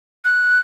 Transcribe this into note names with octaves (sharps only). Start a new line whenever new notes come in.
F#6